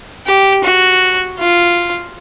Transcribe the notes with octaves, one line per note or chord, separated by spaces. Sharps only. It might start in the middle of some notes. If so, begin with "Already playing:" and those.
G4
F#4
F4